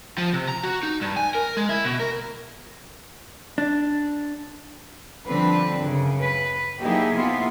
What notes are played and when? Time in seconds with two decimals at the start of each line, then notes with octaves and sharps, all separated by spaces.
0.18 F3
0.33 C3
0.49 A#5
0.63 F#4
0.83 D#4
1.02 G2
1.16 G#5
1.35 A#4
1.57 G#3
1.69 E4
1.84 B2
2.00 A#4
3.58 D4
5.26 D3 F3 G3 C4 D4 B4
5.83 F#2 C#3
6.21 B4
6.79 F#3 A#3 D#4 E4 G4 G#4
7.15 C3 A#3 B3 E4 F4